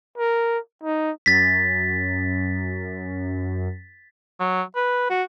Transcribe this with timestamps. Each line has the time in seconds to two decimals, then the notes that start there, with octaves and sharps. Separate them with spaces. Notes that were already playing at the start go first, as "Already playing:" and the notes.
0.18 A#4
0.84 D#4
1.26 F#2 A6 B6
4.40 F#3
4.76 B4
5.10 F#4